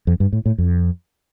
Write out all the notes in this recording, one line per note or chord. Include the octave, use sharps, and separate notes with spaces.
F2
G2
A2
A2
F2